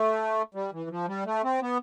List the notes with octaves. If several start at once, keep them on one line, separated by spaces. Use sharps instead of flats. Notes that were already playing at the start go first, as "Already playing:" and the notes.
Already playing: A3
G3
E3
F3
G3
A3
C4
B3